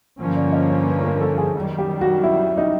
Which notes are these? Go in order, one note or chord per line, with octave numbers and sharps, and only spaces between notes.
G2 D3 F3 A#3 C#4
D5
D#5
C#5
B4
A#4
A4
G#4
F#2 D#3 G3
G4
F#4
E4
D#4